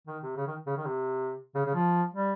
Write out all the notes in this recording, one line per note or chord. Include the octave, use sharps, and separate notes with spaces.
D#3
C3
C#3
D#3
C#3
D#3
C3
C#3
C#3
F3
G3